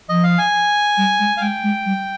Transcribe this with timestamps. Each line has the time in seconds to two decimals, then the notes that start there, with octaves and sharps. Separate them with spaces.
0.09 F3 D#5
0.23 F5
0.38 G#5
0.97 G3
1.19 G#3
1.37 F5
1.41 G#3 G5
1.63 G#3
1.86 G3